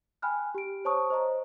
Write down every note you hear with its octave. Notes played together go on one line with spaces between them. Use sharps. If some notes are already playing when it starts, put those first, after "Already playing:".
G5 G#5 B5 F6 F#6
G4 D7
C5 C#5 A5 C#6 D#6
C5 D#5 A#5